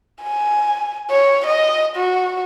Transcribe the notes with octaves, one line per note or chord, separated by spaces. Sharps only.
G#5
C#5
D#5
F#4